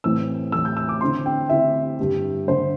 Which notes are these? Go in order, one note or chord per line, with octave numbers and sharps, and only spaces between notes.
A2 E3 A3 C4 E6
A2 E3 A3 C4 E6
G6
E6
D6
D3 C4 E4 C6
G5
D3 C4 E4 E5
G2 D3 G3
G2 D3 G3 C5